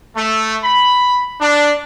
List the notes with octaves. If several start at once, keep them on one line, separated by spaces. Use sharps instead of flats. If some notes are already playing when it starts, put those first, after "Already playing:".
A3
B5
D4